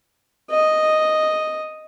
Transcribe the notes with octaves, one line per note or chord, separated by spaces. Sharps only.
D#5